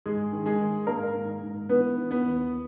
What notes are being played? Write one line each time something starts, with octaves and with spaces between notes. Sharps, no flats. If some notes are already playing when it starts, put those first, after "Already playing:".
G#2 G#3 G#4
D#3
G#3 G#4
D#3
G#2 A#3 A#4
G#2
G#2
E3 B3 B4
E3
B3 B4
D#2